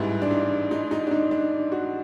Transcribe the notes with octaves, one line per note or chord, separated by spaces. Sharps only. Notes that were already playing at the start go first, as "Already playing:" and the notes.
Already playing: A1 G#2 E3 G3 E4
D4
D#4
D#4
D#4
D4
D#4
D4
F#4